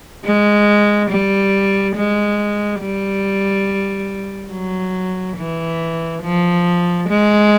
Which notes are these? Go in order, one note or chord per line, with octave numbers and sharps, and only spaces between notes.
G#3
G3
G#3
G3
F#3
E3
F3
G#3